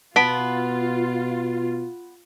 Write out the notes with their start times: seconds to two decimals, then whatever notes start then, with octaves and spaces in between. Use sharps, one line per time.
0.16 B2 B3 F4 A5 B6 D7